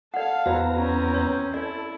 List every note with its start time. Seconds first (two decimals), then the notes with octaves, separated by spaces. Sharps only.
0.14 A4 D5 F5 F#5
0.46 E2 B3 F#4 C5 D5 A#5
0.75 C4 C#4
1.14 C#5
1.54 E4 A4 D5